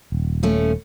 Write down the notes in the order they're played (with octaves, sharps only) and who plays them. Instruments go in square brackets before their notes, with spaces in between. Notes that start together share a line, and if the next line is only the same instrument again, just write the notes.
[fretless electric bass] D#1
[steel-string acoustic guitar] F3 A3 C#4